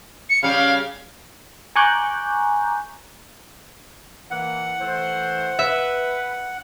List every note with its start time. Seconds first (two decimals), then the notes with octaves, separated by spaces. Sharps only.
0.29 C#7
0.43 C#3 G3 F5
1.76 G#5 A#5 C#6 D6 F#6 G6
4.31 E3 A#3 F#5
4.80 E3 A3 C5
5.59 B4 E5